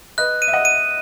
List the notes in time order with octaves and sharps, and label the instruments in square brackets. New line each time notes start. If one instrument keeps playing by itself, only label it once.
[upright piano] B4 D#5 [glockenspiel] F#6
[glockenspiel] D#7
[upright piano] E5
D#5 F#5
[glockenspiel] D#7